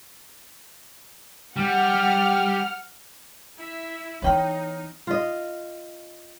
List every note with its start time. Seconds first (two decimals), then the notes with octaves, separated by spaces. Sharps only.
1.56 G3 F#5 F6
3.58 E4 E5
4.22 E3 B3 D#4 B4 C#5 G5 B5 F6
5.07 F4 D#5